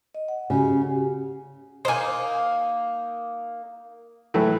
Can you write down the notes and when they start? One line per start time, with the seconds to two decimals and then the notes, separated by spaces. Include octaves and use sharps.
0.15 D#5
0.28 F#5
0.50 C#3 F#4 G4
1.85 A#3 D#4 C5 G#5
4.34 A2 E3 F#3 A3